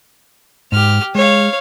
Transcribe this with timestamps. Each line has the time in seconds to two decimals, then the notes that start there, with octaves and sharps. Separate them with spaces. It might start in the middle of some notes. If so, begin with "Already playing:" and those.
0.72 G#2 G4 F6
1.15 G#3 C#5 F5